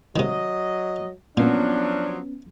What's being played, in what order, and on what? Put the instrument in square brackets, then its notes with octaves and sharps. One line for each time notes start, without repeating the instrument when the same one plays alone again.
[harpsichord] C3 D#3 [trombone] F#3 [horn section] D#5
[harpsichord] A#2 [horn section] F3 F#3 [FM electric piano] B3 C#4 [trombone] D4